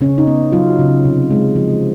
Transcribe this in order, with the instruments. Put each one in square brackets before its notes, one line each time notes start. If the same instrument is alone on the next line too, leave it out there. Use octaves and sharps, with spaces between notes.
[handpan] C#3 C#4
D#4
B3
F#3 F4
C#3
C3
G#3
F3